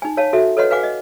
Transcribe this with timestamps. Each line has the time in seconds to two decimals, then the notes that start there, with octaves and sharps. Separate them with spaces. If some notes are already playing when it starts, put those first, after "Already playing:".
0.02 D#4 G#5
0.17 C#5 F5 A5
0.33 F#4 A4 E5
0.57 A4 B4 C#5 D#5 F#5 C6
0.70 B4 F5 F#5 G#5 D6
0.83 D#5